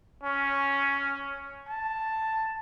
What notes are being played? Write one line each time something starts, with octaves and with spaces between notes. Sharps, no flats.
C#4
A5